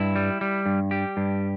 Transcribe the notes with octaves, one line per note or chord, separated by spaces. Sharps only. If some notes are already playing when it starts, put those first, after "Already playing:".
Already playing: G2 E4
G3
G3
G2
G3 G4
G2